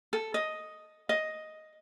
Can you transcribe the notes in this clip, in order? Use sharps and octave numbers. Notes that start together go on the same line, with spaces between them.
A4
D#5
D#5